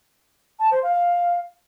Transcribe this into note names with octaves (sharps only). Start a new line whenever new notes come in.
A5
C5
F5